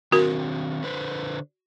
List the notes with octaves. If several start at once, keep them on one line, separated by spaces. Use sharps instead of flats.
D#3 C4 D4 F#4 A#4
D3 B4 C5